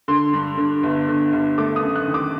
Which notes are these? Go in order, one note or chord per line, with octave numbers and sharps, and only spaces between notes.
D3 C6
G2
D3
G1
D3
G1
A3 D6
D#6
F#2
F#6
D#3
D6